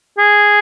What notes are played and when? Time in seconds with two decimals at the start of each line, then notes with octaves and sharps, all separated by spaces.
0.18 G#4